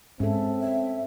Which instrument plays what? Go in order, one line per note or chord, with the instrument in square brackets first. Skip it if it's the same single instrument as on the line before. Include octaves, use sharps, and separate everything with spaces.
[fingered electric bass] G#2 [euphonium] C4 [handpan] C#4 A4 [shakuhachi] E5
[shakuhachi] E5